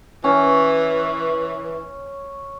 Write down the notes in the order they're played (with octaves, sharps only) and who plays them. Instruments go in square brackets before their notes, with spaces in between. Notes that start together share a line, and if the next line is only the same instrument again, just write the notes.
[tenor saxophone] E3 [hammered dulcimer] C#4 [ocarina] B4